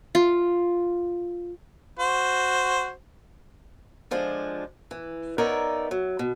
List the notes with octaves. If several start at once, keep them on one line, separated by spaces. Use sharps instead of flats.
F4
F#4 C5
D3 F3 G#3 D4
E3
B3 D#4 A#4 C#5 D5 E5
F#3
B2